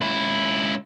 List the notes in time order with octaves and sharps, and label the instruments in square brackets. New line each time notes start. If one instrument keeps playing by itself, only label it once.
[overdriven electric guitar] C#2 E4